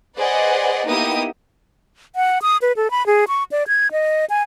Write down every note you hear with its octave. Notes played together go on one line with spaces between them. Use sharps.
G#4 B4 C5 D5 D#5 F#5
A#3 B3 D#4 E4 G4 D#6
F#5
D#6
B4
A4
B5
G#4
C#6
D5
G#6
D#5
G#5